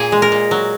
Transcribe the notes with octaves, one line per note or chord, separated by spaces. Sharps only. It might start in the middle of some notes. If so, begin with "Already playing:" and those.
Already playing: A#2 G#4
G#3
A#4
A#2
F#3